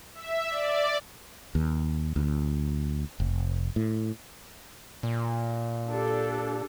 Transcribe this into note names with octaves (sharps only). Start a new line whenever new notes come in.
E5
D5
D#2
D2
F1
A2
A#2
D4 G4 A4